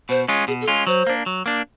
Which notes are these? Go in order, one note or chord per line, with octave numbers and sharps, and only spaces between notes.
B2 C5
G#3 C#4 F4
B2 G#4
A4
G#3 C#4 F4
F#3 C5
A#3 D4
F#3
A#3 D4